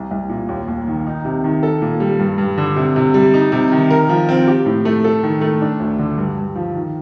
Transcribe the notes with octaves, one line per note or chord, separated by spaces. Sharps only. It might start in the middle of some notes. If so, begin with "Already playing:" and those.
Already playing: C2
C2
A#2
D#2
D#2
D#3
D#4
C3
D#3
A4
A#2
G3
G2
G2
D3
C3
C3
G3
D#4
C3
D#3
A#4
F3
C4
G4
A2
A3
A4
D#3
A3
D4
D2
D3
G2
G2
F3
D#3